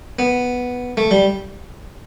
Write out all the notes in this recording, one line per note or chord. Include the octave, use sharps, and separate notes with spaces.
B3
A3
G3